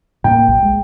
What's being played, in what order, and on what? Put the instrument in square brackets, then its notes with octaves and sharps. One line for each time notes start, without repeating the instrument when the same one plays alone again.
[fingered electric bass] A2 A#3 [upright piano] G5
[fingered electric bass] B1
G#3